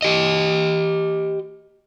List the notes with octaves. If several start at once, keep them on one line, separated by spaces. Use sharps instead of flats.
G4 D#5